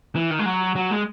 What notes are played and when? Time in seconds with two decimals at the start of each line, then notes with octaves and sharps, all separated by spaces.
0.15 E3
0.31 D#3
0.39 G#3
0.46 F#3
0.76 F#3
0.91 G#3